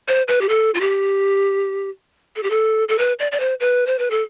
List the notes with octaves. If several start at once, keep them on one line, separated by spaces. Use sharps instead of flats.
C5
B4
G4
A4
F4
G4
A4
G4
A4
A4
B4
D5
D5
C5
B4
C5
B4
A4